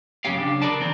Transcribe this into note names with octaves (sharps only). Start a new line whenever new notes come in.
B1 F#2 C#3 C#4 G4 F5
C#3 D4
G#4 A#4 B4 D5 A5
E2 D#3 C4